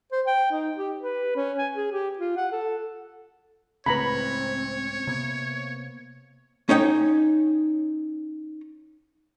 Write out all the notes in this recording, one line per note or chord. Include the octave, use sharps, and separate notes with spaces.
C5
G5
D#4
G4
B4
C#4
G#5
G#4
G4
F4
F#5
A4
C#2 A2 C#3 C4 B4 C#5 A#5 B5
C3 A#3 B3
C#4 D#4 C#5 G5